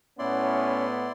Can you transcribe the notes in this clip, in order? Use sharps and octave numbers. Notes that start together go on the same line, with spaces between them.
A2 B3 C#4 E4 D5 C6